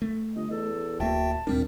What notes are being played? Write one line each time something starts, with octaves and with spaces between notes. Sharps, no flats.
A3
G1 D#5
E2 A4
D1 A#3 F#4 E5 G5 A5
D#2 A#2 G3 C4 D4 A#4